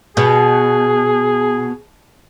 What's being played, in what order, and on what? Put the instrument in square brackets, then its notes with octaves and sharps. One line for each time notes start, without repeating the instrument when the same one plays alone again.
[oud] B2 [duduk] G#4